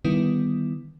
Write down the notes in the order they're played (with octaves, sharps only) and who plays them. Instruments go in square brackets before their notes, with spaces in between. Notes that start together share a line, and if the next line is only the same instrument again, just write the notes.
[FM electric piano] D3 D#3 G3 B3 E4